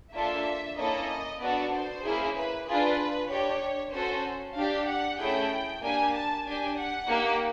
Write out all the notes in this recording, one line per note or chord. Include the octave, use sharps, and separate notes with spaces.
A#3 D4 F4 A4 E5
A#3 C#4 E4 A4 D#5
B3 D4 F#4 A4 D5
C5
A#3 C#4 E4 G#4
B4
D4 F4 G#4 B4
D4 G4 C#5
C#4 F#4 A4 C5
D4 G4 F5
F#5
A3 C#4 E4 G#4 G5
A#3 D4 G4 G#5
A5
D4 G4 G#5
F#5
A#3 D#4 G4